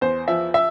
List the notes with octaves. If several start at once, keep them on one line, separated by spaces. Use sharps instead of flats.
E2 C5
F3 E5
E5